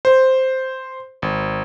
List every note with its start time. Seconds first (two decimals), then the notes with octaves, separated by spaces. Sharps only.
0.05 C5
1.22 G#1